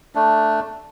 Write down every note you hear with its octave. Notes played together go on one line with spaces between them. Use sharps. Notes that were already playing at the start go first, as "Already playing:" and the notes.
A3 D4